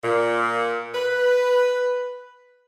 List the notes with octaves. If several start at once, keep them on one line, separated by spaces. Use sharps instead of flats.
A#2
B4